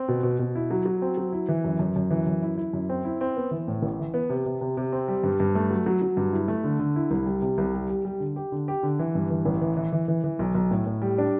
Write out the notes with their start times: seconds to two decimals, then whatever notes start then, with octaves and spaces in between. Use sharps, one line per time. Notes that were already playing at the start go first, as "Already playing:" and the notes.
Already playing: C4
0.08 B2
0.23 B2
0.39 B2
0.55 E4
0.71 F#3
0.86 F#3
1.02 C4
1.17 F#3
1.33 E4
1.49 E3
1.64 F#2
1.79 F#2
1.96 F#2
2.10 E3
2.27 F#2
2.42 E4
2.58 E4
2.73 F#2
2.89 C4
3.05 E4
3.21 C4
3.36 B3
3.51 E3
3.68 A2
3.82 A1
3.99 E3
4.14 B3
4.29 C3
4.46 C3
4.61 C3
4.77 C3
4.92 C4
5.08 G3
5.23 G2
5.40 G2
5.55 A3
5.71 F#3
5.86 F#3
6.02 F#3
6.17 G2
6.33 E4
6.48 A3
6.64 D3
6.79 D3
6.96 E4
7.11 C2
7.26 G3
7.42 C3
7.58 C2
7.74 G3
7.90 G3
8.05 G3
8.20 D3
8.36 G4
8.52 D3
8.68 G4
8.83 D3
8.99 E3
9.15 G2
9.30 E3
9.45 A1
9.61 E3
9.77 E3
9.92 E3
10.08 E3
10.24 E3
10.39 B1
10.55 B1
10.71 A2
10.86 A2
11.02 G3
11.18 D4